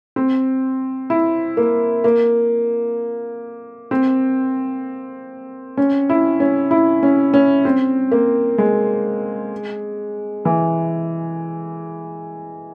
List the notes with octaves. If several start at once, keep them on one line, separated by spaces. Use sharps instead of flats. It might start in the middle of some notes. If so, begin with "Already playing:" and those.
C4
E4
A#3
A#3
C4
C#4
E4
C#4
E4
C#4
C#4
C4
A#3
G#3
E3